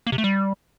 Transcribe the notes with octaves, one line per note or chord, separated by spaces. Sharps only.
A#3
C3
A3
G3